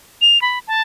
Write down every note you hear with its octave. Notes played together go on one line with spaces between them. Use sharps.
F7
B5
A5